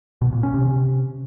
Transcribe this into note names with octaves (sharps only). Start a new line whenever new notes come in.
B2
A#2
C#4
C3
C3